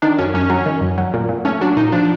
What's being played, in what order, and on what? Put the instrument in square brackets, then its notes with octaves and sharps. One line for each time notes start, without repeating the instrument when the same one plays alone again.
[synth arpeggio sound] D#3 [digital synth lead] D4
[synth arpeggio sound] F#2 [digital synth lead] C#4
[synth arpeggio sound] F#2 [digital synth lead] C#4
[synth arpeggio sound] F#3
D#3
F#2
F#3
A#2
A#2
[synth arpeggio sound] A3 [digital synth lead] C#4
[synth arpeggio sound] F#3 [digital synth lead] D4
[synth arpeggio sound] A#2 [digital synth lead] D#4
[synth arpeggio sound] F3 [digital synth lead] D4